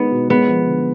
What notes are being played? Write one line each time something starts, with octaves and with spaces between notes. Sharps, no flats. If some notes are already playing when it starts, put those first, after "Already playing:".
Already playing: G#3 B3 D#4
B2
G#3 B3
F3
D3